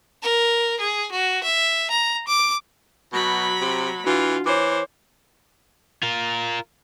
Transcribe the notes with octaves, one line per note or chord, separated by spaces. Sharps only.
A#4
G#4
F#4
E5
A#5
D6
B2 F#3 B5
C3
E3 D4 F4 F#4
E3 C5 C#5 D6
F4 A#4